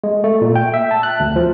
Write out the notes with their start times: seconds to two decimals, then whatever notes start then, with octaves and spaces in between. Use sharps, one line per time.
0.04 G#3
0.24 A3
0.41 A#2
0.56 G5
0.74 E5
0.91 A5
1.03 F#6
1.20 D2
1.36 F3